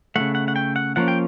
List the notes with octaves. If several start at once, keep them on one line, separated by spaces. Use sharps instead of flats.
C#3 F3 A3 F#5
F#5
F#5
G5
F#5
F3 A#3 C#4 F#5
G5